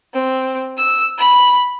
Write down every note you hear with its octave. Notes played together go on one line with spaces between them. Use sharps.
C4
E6
B5